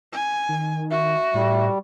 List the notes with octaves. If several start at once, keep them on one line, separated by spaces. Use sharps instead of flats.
G#5
D#3
F#4 E5
A2 G3